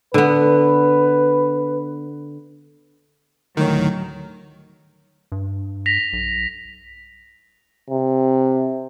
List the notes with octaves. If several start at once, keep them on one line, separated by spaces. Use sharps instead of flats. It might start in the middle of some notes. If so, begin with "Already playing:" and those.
D3 B3 B4
D2 A2 D#3 F#3 C#5
G2
A#6 B6 F7
B1
C3